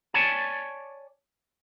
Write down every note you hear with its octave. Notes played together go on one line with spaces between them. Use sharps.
C#5 D5 G#5 A5